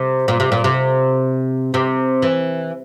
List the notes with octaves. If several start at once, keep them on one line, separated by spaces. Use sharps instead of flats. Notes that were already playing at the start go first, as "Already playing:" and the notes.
Already playing: C3
A#2
C3
A#2
C3
C3
E3